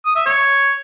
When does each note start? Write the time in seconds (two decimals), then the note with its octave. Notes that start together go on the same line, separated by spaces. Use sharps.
0.05 D#6
0.16 E5
0.26 C#5